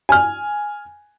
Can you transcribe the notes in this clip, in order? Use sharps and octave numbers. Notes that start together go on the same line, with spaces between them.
G#5 F6